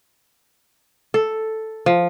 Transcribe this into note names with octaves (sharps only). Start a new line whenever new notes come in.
A4
F3